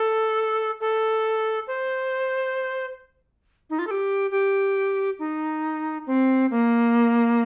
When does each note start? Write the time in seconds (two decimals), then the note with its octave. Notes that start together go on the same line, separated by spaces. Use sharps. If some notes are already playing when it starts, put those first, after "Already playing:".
Already playing: A4
0.80 A4
1.67 C5
3.70 D#4
3.79 F4
3.87 A4
3.91 G4
4.31 G4
5.19 D#4
6.07 C4
6.51 A#3